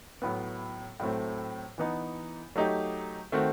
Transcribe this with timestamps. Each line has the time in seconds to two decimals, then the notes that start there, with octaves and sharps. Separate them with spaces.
0.22 A2 F#3 B3
1.00 A2 F#3 A3 C4
1.78 E3 B3 D#4
2.56 F#3 A3 D#4 G4
3.32 D#3 A3 C4 F#4